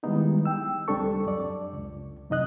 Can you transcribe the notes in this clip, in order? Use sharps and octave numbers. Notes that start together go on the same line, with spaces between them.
D#3 G3 G#3 B3 D#4 E4
G5 E6
C#2 G3 C4 D4 A4 C#6
F#2 D5
C#2
F#2 C3 D#4 D#5 F#6